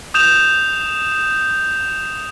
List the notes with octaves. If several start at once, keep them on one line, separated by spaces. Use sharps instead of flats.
D#6 G6 E7 F7